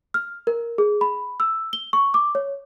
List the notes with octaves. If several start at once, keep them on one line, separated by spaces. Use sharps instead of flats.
F6
A#4
G#4
B5
E6
G7
C#6
D6
C#5